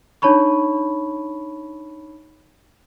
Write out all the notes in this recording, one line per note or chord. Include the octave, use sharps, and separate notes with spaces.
D4 D#4 C#5 A5 B5 C#6